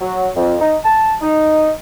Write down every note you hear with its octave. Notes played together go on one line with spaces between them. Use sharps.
F#3
F2
D#4
A5
D#4